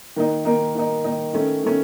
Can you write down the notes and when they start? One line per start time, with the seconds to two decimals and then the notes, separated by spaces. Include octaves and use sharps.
0.16 D#3 A#3 D#4
0.45 D#3 A#3 D#4
0.75 D#3 A#3 D#4
1.04 D#3 A#3 D#4
1.33 D#3 A3 C#4
1.63 D#3 A3 C#4